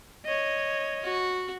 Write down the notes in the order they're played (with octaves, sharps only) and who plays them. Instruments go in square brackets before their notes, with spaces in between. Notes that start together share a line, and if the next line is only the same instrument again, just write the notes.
[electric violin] C#5 D#5
[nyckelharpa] F#4 C#6